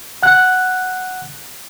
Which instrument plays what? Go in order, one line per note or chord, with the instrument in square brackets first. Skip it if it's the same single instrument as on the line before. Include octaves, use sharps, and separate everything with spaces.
[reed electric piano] F#5 F#6